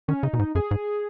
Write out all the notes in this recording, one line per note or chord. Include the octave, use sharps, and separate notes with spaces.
D#3 C#4
C#3 D#4
B2
G#2
F#2 G#4
G#2